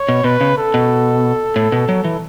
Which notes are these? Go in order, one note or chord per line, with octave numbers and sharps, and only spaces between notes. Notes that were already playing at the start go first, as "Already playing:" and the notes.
Already playing: C#5
B2
B2 B4
C#3
A4
B2
A2
B2
F#3
E3